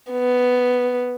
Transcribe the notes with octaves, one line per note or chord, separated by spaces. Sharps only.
B3